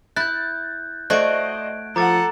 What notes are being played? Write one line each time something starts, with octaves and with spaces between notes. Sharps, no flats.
E4 F#6 G6 A6
A3 F#4 C5 D5 D#5 F#6 G#6 D7
F3 A4 F#5 A#5 D6 A6